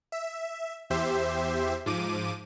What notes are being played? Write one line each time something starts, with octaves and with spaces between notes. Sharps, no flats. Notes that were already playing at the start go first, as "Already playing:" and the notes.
E5
E2 G4 C5 E5
G#2 F3 D6 D#7